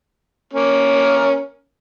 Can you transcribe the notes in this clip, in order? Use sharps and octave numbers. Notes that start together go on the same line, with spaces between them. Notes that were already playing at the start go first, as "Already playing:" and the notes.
A#3 C#4 A#4